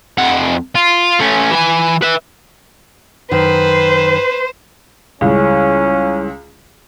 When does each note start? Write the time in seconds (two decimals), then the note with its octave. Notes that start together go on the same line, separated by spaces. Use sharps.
0.18 F2 F#5
0.75 F4
1.20 A3 C#4
1.51 E3 G#5
2.02 B4 E5
3.31 F#2 D#3 B4 C5
5.21 C#2 G3 C#4 E4 G#4